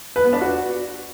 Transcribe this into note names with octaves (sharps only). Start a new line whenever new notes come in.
B4
B3
D4
F#4